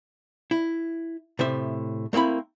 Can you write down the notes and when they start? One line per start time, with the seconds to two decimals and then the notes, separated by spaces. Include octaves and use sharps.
0.51 E4
1.39 A2 C3 C5 E5
2.13 A3 A#3 C4 E4 B5